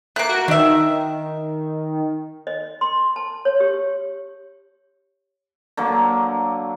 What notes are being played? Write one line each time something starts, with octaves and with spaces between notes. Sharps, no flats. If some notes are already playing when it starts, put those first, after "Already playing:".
A3 A#3 F#6 D7
F#4 A#4
D#3 D4 E5
D#5
C6
A5
C#5
G4
D3 F#3 A#3